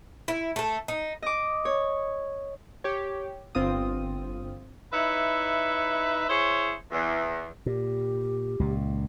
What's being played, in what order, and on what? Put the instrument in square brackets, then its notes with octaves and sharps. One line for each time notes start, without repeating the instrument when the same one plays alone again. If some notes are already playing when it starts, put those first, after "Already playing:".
[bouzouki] E4
A3 A4
D#4
[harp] D#5 D6
C#5
[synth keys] G4 C#5
G1 C4 F4 D#6
[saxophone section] D#4 E4 B4 C#5 E5
E4 G#4 C5 C#5
E2
[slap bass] A#2 [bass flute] G4
[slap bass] C#2 A#2